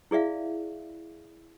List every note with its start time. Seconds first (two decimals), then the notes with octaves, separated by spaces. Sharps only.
0.11 E4 G#4 D5 E5 F5